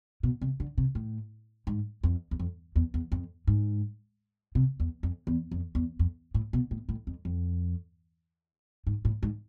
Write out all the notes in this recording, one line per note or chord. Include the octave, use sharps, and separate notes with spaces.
B2
C3
D3
C3
A2
G#2
F2
E2
F2
E2
E2
F2
G#2
C3
E2
F2
E2
F2
E2
F2
A2
B2
A2
A2
F2
F2
G#2
A2
G#2